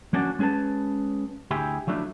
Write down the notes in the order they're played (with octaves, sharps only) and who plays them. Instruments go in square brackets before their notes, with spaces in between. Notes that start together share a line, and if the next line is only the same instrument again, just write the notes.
[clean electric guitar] F3 A#3 C#4 D4 F#4 D5
G#3 C#4 G#4 B4 A5
D2 E4 G4 G#4
F3 F#3 A3 D4 E4